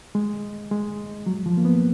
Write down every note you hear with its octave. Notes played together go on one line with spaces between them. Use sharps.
G#3
G#3
F#3
F3
A#3
B3